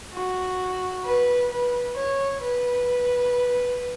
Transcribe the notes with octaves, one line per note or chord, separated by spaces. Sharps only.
F#4
B4
B4
C#5
B4